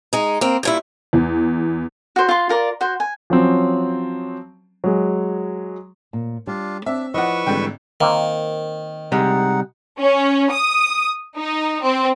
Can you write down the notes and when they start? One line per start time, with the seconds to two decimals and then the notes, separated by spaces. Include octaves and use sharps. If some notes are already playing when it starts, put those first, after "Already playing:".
0.13 G#3 D#4
0.41 A#3 C4
0.63 G2 A#2 E4
1.13 E2
2.16 F#4 C5
2.29 F4 C6
2.49 F4 A#4 D5
2.81 F#4 C5
3.00 G#5
3.30 F3 F#3 C4 C#4
4.84 F#3 G#3
6.13 A#2
6.47 G3 D4 F4
6.86 C4 D4 E5
7.14 F3 E4 B4 D5 D#5 F#5 C#6 E6
7.46 G#1 D3 E3 G3 G#3 G5
8.01 D#3 A#3 C4
9.12 C3 G3 G#3 D#4 F#5
9.99 C#4
10.50 D#6
11.37 D#4
11.82 C4